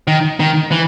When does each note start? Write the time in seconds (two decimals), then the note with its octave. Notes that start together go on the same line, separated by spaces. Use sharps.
0.07 D#3
0.40 D#3
0.72 E3